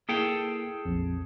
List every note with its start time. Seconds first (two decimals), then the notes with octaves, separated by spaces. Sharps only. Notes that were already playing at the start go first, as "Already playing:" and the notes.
0.09 A#3 E4 G#4 A4 G5
0.85 A#1 F2